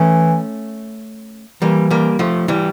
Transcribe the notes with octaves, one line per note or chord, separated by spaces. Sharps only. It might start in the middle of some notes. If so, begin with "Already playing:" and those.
Already playing: E3 A3 C#4
E3 G3 A#3
G3 A#3
F3 A3
E3 G3